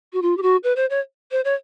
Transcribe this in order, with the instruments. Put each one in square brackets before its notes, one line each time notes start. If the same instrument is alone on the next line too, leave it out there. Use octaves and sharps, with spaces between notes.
[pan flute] F#4
F4
G4
F#4
B4
C5
C#5
C5
C#5